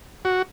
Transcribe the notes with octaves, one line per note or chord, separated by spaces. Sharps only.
F#4